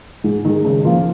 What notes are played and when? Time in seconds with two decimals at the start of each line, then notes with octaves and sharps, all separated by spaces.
0.24 G#2
0.45 D#3 G#3
0.64 C#3
0.85 F3 A#3 F4